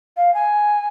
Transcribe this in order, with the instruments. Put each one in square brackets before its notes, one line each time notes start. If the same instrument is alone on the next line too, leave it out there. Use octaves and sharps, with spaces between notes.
[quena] F5
G#5